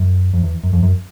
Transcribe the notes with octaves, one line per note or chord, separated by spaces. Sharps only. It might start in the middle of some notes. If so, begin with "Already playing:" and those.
Already playing: F#2
F2
E2
F#2
F2
F#2